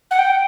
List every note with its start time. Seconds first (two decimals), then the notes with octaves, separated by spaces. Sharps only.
0.10 F#5
0.18 G5